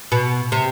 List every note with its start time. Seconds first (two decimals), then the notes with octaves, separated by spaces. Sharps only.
0.12 B2
0.52 C3